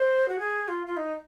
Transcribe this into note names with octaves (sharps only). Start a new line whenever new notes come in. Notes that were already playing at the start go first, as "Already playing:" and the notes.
Already playing: C5
F#4
G#4
F4
F4
D#4